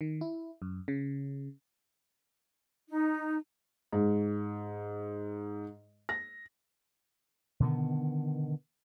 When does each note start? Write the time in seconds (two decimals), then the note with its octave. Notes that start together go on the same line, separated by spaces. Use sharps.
0.01 D#3
0.21 E4
0.62 F#2
0.88 C#3
2.88 D#4
3.93 G#2
6.09 A#6
7.60 B2 D3 D#3 B3